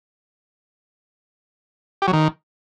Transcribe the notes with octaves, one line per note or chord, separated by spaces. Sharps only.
G4
F#3
D#3